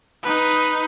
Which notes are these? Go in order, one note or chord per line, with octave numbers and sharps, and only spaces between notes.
D#4 B4